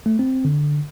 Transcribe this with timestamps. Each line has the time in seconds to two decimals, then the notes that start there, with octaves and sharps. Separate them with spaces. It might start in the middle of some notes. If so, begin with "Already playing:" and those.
0.06 A3
0.19 C4
0.45 D3